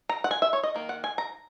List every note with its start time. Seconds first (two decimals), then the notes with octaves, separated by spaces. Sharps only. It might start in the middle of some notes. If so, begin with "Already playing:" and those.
0.09 A#5
0.24 F#5
0.31 G#5
0.42 E5
0.53 C#5
0.63 D#5
0.74 D#3 A#3
0.89 F#5
1.04 G#5
1.18 A#5